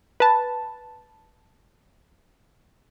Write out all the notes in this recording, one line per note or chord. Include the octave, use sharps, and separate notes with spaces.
B4 A5